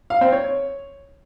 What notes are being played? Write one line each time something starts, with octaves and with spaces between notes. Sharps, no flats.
F5
C4
C#5